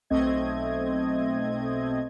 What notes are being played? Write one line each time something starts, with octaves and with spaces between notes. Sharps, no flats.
B1 A3 C4 D#5 G#6